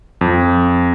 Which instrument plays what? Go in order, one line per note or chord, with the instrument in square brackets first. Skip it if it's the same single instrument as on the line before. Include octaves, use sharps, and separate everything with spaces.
[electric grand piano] F2